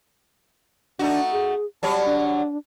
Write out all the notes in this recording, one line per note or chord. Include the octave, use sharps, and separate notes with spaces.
A3 D4 D#4 F#4
G#4
F#3 G3 C#5 A5
D4